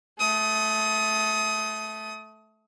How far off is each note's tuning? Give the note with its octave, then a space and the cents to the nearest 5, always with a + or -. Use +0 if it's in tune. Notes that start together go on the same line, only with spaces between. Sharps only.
A3 -15 D#6 +20